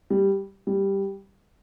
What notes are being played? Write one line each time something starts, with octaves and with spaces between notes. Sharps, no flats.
G3
G3